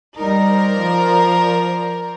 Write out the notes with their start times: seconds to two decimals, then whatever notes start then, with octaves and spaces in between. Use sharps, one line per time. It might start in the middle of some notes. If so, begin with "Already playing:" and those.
0.17 G3 D#4 A#4 C5 D5
0.77 F3